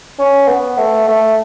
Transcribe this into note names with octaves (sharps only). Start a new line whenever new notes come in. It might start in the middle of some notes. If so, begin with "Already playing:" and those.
C#4
B3
A3
A3